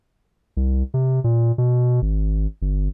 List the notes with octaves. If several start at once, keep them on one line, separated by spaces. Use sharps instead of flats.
C2
C3
A#2
B2
G#1
G1